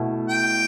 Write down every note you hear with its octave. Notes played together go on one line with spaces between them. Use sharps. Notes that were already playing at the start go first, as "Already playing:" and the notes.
Already playing: B2 A3 E4
G5